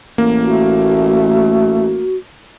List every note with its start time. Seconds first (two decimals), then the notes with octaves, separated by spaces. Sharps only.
0.18 A1 A#3
0.42 A3 F#4